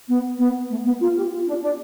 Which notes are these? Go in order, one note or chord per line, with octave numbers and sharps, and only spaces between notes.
B3
B3
A3
B3
F4
G4
F4
D4
D4